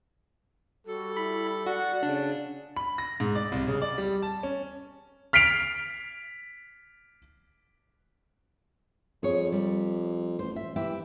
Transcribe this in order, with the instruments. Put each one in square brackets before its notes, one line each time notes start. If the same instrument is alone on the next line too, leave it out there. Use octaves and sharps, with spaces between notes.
[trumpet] G3 [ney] F#4 [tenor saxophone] A4
[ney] E4 [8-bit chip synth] B5
[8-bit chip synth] F#4 [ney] D5 [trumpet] F#5
[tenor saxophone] C#3 [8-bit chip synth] D4
[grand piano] B5
A#6
G#2
D5
C2
C#3
D5
G3
A5
C#4
F6 B6 C7 D7 F7
[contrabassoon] F2 [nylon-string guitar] G#4 C#5
[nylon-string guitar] G3
[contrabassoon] A1 [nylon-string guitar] C5
[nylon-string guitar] E5
[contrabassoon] E3 [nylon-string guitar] E4 G4 E5